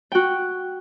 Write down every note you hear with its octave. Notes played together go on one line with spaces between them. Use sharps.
F#4 G5